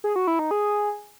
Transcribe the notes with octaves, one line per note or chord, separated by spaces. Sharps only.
G#4
F#4
E4
D#4
G#4